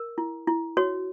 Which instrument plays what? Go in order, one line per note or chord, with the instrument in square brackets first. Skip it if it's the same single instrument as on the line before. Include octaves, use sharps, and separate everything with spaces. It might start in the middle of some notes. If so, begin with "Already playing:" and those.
Already playing: [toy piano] A#4
E4
E4
F#4 C#5